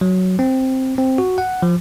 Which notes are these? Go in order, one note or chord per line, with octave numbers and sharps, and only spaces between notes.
F#3
C4
C4
F#4
F#5
F3